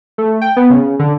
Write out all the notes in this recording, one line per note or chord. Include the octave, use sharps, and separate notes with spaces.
A3
G5
B3
C#3
D3